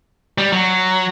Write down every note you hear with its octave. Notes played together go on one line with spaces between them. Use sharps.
G3
F#3